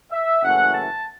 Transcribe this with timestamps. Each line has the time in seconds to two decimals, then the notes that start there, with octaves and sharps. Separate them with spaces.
0.11 E5
0.43 F#1 F#2 E3 A3 C#4 F#5
0.74 A5